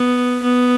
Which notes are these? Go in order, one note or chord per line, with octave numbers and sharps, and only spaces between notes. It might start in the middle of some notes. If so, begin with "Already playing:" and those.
Already playing: B3
B3